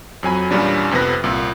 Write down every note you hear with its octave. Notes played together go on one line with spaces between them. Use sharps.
F2 F#3 G#5 B5
E2 A#2 G3 C#4 D4
F2 C3 B3 B4 A#6
C2 A#2